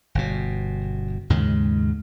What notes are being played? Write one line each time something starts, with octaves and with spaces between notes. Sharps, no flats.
G1 B2
D#2 G#2 C#3 G#3